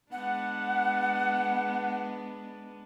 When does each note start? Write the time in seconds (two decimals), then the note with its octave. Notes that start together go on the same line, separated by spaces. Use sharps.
0.12 G#3 B3 D4 F#5